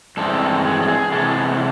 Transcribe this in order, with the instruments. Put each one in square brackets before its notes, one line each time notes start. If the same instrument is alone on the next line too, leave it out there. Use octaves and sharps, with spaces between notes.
[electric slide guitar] G2 E3 G#3 C4 A4
G#4
A4
G#4
C3 E3 G#3 B3 A4